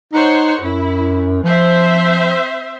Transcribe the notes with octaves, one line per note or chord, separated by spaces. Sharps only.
D#4 C5 C#5 F#5
F#2 E4
F3 C4 C5 E5